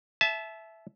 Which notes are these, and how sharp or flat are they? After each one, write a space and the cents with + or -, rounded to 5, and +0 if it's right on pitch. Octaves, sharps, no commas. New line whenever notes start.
E5 +0 A5 -30